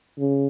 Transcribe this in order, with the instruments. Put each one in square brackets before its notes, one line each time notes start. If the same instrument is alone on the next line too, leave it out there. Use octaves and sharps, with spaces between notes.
[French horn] C#3